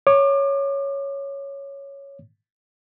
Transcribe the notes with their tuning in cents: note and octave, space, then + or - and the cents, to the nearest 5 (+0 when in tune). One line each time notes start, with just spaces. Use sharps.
C#5 +0 D6 +35